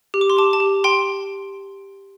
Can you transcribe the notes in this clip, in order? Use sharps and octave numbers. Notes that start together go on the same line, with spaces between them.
G4
D6
C6
G4 A5 D6
A5
G4
G5 C6